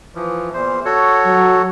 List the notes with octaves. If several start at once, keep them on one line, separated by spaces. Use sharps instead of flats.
E3 F3
E2 A#2 C5
F#4 A4 C#5
F#3